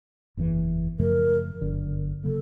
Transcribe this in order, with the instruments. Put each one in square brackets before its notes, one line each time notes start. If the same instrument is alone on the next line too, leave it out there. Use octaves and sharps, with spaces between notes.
[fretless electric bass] F#1 E2 C3 E3
[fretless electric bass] F#2 C#3 F3 A3 [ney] A#4
[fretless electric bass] G1 F#2 D3
[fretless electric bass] C#3 F#3 A#3 [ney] A4